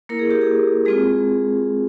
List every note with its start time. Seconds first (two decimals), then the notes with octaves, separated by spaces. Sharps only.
0.09 A#3 E4 A#4
0.19 G#4
0.31 G4
0.41 G#4
0.85 G#3 C4 F4 G#4